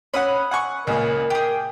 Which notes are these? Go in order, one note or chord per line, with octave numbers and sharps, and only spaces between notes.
C#4 F#5 B5 D#6 E6
F#5 G#5 C#6
C#2 A#2 C#3 A#4
G4 G#4 G5